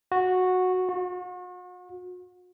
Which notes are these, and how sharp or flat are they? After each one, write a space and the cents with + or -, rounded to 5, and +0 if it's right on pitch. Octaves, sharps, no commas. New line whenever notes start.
F#4 -10
F#4 -40